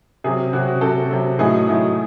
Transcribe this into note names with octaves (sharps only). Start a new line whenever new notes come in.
C3 F#3 C4 G#4
C3 F#3 C4 F#4
F#4
C3 F#3 C4 A4
C3 F#3 C4
A2 F#3 A3 D#4 G#4
A2 F#3 A3 D#4